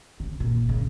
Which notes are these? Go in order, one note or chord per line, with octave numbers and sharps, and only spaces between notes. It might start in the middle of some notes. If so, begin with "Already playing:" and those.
C#3
A#2
C#3